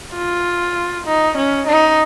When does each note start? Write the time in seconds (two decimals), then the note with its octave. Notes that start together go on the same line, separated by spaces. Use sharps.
0.14 F4
1.06 D#4
1.37 C#4
1.67 D#4